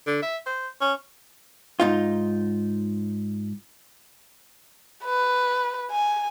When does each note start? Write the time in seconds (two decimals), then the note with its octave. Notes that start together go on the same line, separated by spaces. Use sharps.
0.06 D3
0.22 E5
0.46 C5
0.81 C#4
1.80 G#2 D#4 F4
5.04 B4
5.91 G#5